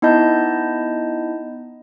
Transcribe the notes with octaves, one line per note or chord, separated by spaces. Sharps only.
B3 D#4 E4 D#5 A5 G6